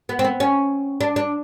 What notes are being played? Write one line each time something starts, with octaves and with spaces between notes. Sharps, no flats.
B3
C4
B3
C#4
D4
D4